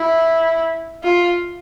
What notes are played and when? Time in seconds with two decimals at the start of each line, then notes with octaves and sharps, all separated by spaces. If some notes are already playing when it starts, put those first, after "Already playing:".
Already playing: E4
1.04 F4